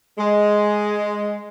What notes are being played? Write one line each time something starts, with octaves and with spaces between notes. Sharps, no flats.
G#3